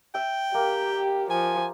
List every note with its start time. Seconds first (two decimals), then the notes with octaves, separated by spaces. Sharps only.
0.15 E5 G5
0.54 A#3 G4
1.30 F3 G#5